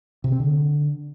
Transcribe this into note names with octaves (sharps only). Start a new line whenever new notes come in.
C3
C4
D3